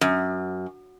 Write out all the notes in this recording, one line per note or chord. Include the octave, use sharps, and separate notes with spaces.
F#2